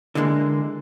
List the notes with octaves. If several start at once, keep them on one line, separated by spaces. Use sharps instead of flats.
D3 E3 G#3 A#3